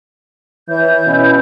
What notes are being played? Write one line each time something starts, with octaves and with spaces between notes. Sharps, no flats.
E3 C#5 G6
B2 C#4 E4 B4